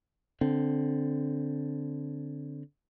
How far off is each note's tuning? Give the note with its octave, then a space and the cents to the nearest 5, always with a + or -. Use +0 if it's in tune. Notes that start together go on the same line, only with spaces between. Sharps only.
D3 -5 C4 +0